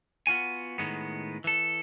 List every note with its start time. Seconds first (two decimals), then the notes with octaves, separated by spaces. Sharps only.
0.27 B3 F4 F#4 G#5
0.78 A2 D#3 G#3 B3
1.44 E3 A4